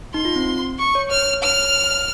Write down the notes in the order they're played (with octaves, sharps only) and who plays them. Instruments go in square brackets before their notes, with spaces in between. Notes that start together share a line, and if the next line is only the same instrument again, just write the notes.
[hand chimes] D#4 [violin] C6
[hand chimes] F4
C4
[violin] C#6
[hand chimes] C#5
[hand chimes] C#5 [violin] F6
[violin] F6